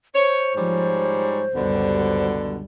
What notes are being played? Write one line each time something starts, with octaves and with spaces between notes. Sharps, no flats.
C5 C#5
G#2 F3 G3 C#5
C#2 F#2 B2 D3 G3